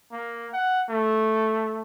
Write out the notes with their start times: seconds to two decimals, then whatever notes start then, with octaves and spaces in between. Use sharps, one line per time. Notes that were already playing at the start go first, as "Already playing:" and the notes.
0.12 A#3
0.53 F#5
0.90 A3